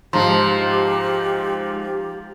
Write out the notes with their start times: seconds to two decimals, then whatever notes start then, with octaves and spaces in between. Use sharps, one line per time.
0.13 G#2 F3 G4 A#5 C6